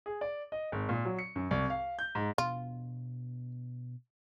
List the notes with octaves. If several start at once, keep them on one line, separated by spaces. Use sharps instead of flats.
G#4
D5
D#5
G#1
A#2
F#3
C#7
F#2
C2
F5
G6
G#2
B2 B3 D4 F4